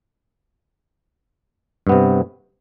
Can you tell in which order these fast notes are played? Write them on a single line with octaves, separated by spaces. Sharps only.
G2 B3 C3